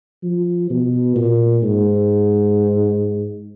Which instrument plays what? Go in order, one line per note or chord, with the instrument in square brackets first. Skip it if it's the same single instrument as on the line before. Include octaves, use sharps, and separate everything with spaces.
[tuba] F3
B2
A#2
G#2